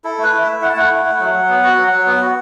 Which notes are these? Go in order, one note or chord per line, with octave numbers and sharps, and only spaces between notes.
E4 A4
A3 B4
E4
A3 E5
E4 F#5
A5
A3 F#5
E4
A3
F#3
F#3
B3
F#4
F#3
F#3
B3
F#4